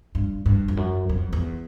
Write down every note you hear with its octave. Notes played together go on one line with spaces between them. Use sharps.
G2
G2
F2
F#2
F2
E2